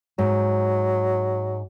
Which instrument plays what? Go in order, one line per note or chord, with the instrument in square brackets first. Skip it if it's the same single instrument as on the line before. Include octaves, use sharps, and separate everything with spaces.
[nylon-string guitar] G#2 [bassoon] F#3